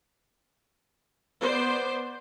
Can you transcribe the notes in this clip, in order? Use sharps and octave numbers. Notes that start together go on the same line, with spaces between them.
B3 C5 D5